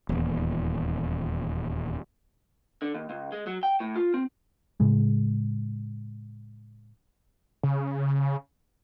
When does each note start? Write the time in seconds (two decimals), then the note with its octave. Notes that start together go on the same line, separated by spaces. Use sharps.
0.09 D#1 E2
2.82 D3
2.95 D#2
3.10 C#2
3.32 G#3
3.47 F#3
3.63 G5
3.80 A2
3.96 F4
4.14 C4
4.80 A2 C#3 G#3
7.63 C#3